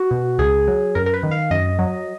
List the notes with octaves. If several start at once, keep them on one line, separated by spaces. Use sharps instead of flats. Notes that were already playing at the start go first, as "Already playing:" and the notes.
Already playing: F#4
B2
C#2 G#4
F#3
F#2 A#4
A#4
B4
D#3
F5
F#2 D#5
F#3